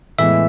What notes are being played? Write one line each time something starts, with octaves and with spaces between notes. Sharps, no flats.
A2 E3 G#3 B3 E5